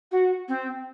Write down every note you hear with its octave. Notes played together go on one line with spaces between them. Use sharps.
F#4
C4